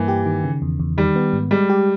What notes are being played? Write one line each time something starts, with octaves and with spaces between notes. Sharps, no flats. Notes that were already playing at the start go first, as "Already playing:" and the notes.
Already playing: G2 E3 A#3
G4
D#3
C#3
E2
E2
D#3 G3
B3
G#2
G3 G#3
G4